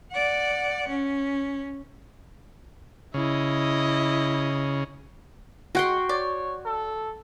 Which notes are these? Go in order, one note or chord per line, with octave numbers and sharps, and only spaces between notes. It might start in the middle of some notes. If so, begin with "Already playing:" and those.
D5 F#5
C#4
C#3 E4 D#5
G#3 F#4 F#5 G5 C6
C#5 D5
A4